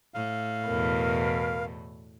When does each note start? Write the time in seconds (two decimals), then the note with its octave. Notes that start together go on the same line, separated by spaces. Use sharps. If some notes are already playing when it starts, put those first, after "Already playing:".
0.14 A2 F5
0.65 E2 B2 A#4